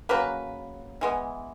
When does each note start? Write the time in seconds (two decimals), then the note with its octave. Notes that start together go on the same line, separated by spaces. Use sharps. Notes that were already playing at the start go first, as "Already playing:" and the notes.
0.09 C#3 F#3 A#3 B4
1.01 E3 G#3 B3